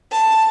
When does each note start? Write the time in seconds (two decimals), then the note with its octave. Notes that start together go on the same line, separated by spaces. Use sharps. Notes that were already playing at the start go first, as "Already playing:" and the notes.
0.11 A5